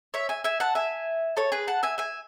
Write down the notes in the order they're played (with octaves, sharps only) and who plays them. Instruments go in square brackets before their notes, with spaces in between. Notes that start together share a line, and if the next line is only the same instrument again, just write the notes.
[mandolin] C#5 E5
E5 G#5
E5 G#5
F#5 A5
E5 G#5
A4 C#5
G#4 B4
F#5 A5
E5 G#5
E5 G#5